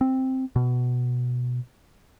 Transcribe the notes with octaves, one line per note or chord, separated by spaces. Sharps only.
C4
B2